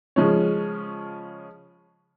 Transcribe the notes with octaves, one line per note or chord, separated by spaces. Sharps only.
C#3 F3 G#3 C#4